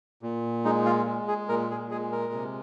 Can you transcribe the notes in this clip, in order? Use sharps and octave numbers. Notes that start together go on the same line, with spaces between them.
A#2
G#3 D#4
F4
G#3
G#4
A#2 A#4
G#4
G#3 G#4
A#4
C3